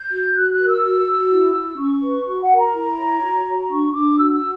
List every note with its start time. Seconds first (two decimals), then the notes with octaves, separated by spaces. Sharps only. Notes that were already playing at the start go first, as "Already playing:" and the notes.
Already playing: G6
0.12 F#4
0.36 F#4 F#6
0.52 F#6
0.59 A#4
0.68 E6
0.83 F#4
1.07 F#4
1.31 E4
1.55 E4
1.78 C#4 C#6
2.02 B4
2.26 F#4 C#6
2.42 F#5
2.50 A#4
2.58 A#5
2.74 E4
2.98 C#5
3.22 F#4
3.45 F#4
3.69 D4 C#6
3.93 D4 D6
4.17 F#4 E6
4.33 E6
4.41 F#4